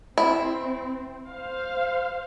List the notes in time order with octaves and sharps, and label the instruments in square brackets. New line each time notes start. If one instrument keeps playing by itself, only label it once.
[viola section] C4 [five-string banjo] E4
[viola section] C5 F5